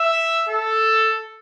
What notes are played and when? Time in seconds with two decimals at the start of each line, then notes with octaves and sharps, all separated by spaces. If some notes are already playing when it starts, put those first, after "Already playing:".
Already playing: E5
0.49 A4